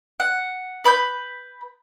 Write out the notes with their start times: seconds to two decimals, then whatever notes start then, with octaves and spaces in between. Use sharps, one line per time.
0.20 F#5
0.84 B4 B5 E6 G6